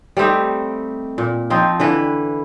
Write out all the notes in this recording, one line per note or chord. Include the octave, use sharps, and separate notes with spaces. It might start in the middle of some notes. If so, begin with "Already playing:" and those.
G3 A3 C4 D#4
A#2
F3 C4 D#4
D3 E3 B4